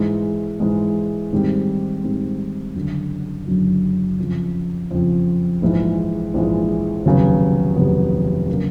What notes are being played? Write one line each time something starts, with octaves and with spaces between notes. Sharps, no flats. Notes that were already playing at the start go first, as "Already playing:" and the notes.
Already playing: G#2 E3 G#3
G#2 E3 G#3
G#2 D#3 G3 C4
G#2 D#3 G3 C4
F#1 F#2 D3 F#3
F#1 F#2 D3 F#3
F2 C#3 F3
F2 C#3 F3
A#1 G#2 E3 G#3
A#1 G#2 E3 G#3
F1 D#2 C#3 F#3 B3
F1 D#2 C#3 F#3 B3
C#3 F#3 A#3 D4